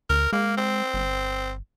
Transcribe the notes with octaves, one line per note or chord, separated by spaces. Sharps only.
D2 A#4
G#3 A#3
C4
G1